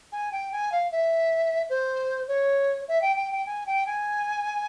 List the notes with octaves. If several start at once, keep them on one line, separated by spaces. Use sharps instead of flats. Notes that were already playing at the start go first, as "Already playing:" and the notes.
G#5
G5
G#5
F5
E5
C5
C#5
E5
G5
G5
G5
G#5
G5
G#5